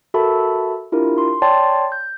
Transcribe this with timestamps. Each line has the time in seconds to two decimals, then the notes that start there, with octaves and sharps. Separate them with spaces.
0.14 F#4 A4 A#4 E5 A5 B5
0.92 D4 E4 F4 G4 A#4
1.18 C6
1.42 C#5 D5 G5 A5 C6
1.92 G6